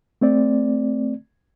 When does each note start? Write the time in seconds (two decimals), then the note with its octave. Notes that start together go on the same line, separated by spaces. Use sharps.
0.21 A3 C4 D5